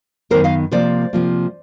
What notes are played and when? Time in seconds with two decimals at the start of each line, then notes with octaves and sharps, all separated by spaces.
0.30 F#2 D#3 G#3 B3 A#4 C5
0.44 D#5 F5
0.72 C3 F3 A#3 C5 D5
1.13 C3 F3 A#3